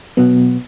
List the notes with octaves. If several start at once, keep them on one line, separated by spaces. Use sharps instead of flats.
B2 F#3 B3